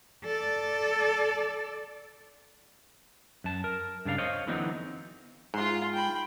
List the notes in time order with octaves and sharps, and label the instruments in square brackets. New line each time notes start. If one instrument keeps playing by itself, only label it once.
[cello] A4 D5
[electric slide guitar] F#2 A5
A#4
G2 C#3 D4 F5
C5 C#5 D#5 F5
D3 E3 F#3 B3 C4 D#4
[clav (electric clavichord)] G#2 [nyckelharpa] F4 C6
[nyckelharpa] G5 B5